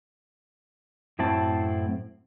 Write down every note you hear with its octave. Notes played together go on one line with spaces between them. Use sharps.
F#2 A2 C4 E4 A5